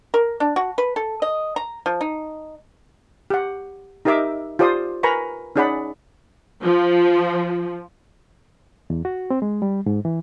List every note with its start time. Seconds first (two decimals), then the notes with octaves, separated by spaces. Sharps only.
0.14 A#4
0.40 D4
0.56 F#4
0.78 B4
0.96 A4
1.22 D#5
1.56 A#5
1.86 F3
2.01 D#4
3.30 G4 F#5
4.05 D#4 G4 A#4 D#5 E5 D6
4.59 F4 G4 C5 D5 C6 D#6
5.03 A#4 B4 G#5 A#5 B5 C#6
5.56 C#4 D#4 G#4 D5 F#5 B5
6.63 F3
8.90 E2
9.05 F#4
9.30 C4
9.42 G#3
9.62 G3
9.86 G#2
10.05 E3